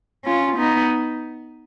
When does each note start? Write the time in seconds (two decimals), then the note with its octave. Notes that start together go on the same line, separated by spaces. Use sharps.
0.25 C#4 F4
0.57 B3 D#4